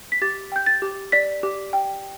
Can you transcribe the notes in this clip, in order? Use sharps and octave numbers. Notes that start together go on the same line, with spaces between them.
B6
G4 A6
G5 G6
A6
G4
D5 B6
G4
G5